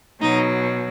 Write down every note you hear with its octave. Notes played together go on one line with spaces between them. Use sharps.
B2 F#3 D#4